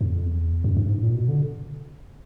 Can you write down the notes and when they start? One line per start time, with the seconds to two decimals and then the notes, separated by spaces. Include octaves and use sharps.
0.01 F2
0.26 E2
0.64 F#2
0.77 G2
0.89 G#2
1.02 A#2
1.15 B2
1.28 D3